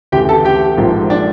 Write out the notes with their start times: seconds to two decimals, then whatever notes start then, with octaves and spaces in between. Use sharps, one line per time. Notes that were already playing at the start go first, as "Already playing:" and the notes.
0.12 D2 C#3 E3 A3 G4 G5
0.29 A4 A5
0.45 G4 G5
0.78 A#1 G#2 F3 A#3
1.10 D4 D5